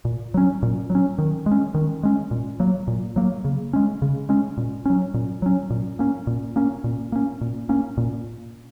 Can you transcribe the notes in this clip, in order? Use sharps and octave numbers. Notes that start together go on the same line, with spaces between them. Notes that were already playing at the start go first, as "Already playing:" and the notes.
A#2
F#3 C#4
A#2
F#3
C#4
D#3
G#3
C#4
D#3
G#3 C#4
A#2
F#3 A#3
A#2
F#3 A#3
C#3
G#3 C#4
C#3
G#3 C#4
A#2
F#3 C#4
A#2
F#3 C#4
A#2
A#3 C#4
A#2
A#3 C#4
A#2
A#3 C#4
A#2
A#3 C#4
A#2